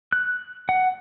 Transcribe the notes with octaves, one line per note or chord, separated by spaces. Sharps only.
F#6
F#5